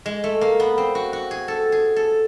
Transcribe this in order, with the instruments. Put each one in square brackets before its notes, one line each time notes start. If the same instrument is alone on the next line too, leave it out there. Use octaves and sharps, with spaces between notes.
[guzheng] G#3
A3
A#3
B3
C4
F#4
F#4
G#4
A4
G#4
A4